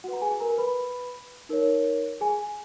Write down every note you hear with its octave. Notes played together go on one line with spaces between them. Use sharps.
F#4 B4 F#5
A#5
G#4 G#5
A#4 A#5
B4 B5
D#4 A#4 C#5
G#4 G#5